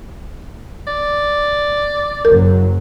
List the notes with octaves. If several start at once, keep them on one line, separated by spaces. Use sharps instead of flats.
D5
F#1 F#2 F#3 A#4